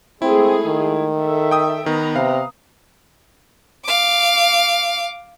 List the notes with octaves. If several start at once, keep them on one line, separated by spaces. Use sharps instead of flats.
G#3 A3 C4 E4 G#4
D#3
A4 E5
G5 D#6
D#3 B3 B4 A#5
C3 F5
F5 D6